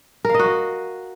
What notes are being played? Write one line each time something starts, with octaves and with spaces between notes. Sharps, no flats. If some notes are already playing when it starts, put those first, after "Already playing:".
F#4 A#4 D#5 F5